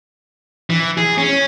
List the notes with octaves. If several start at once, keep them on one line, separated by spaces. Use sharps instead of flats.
E3
G#4
C#4